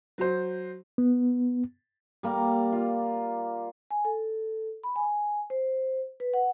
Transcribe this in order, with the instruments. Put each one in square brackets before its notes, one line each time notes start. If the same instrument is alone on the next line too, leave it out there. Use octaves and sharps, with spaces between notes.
[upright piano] F#3 C5
[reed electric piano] B3
[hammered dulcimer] G3 A#3 D5
F4
[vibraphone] G#5
A4
B5
G#5
C5
B4
F#5